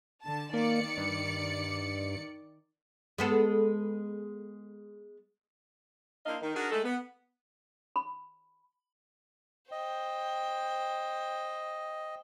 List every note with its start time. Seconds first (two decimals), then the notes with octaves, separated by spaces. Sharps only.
0.24 D3 A5
0.54 D#3 A#3 D5 C#7
0.97 G2
3.18 G#3 B3 A4
6.26 A#3 D4 E4 C5 D#5 F5
6.42 D#3
6.55 D4 F#4 G#4 A#4
6.71 G#3 A3 A4
6.84 B3
7.96 B5
9.72 C5 D#5 G5